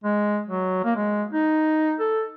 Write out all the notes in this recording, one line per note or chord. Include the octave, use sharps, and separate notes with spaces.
G#3
F#3
A#3
G#3
D#4
A4